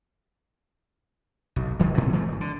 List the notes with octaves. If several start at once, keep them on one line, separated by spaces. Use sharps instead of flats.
B1
D1 D#3 F#3
G#2 C3 B3
E3 G#3 A3
F#1
D3